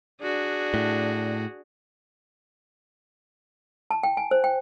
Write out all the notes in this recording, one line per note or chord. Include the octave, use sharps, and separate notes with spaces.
D4 F#4 G#4
A2
A5
G5
G#5
C5
G5